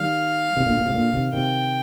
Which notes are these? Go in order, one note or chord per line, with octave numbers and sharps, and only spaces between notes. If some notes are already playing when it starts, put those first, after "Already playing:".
Already playing: D#3 G3 F5
C3 D#3
A#2 D3
A#2
A2 C3
A#2 D3
C3 D#3
C3 D#3 G5